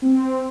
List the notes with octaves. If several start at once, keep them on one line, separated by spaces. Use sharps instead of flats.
C4